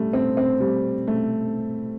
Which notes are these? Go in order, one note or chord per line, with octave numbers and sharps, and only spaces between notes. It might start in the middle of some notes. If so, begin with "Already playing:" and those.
Already playing: G3 A3
C4
C4
G3
A3